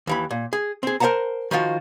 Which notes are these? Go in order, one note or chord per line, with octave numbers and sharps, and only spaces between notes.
D#2 E3 B5
A#2
G#4
C4 G#4
A#4 C5 F5 F#5 A5 A#5
D#3 F3 F4 F#4